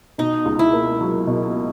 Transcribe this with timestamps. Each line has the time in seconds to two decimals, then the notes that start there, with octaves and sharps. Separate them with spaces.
0.18 B2 D#4
0.45 C#2
0.59 E4
0.73 A#3
1.01 F#3
1.27 B2